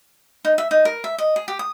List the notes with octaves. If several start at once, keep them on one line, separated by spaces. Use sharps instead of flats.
D#4
E5
D#4
A#4
E5
D#5
G#4
G4
D#6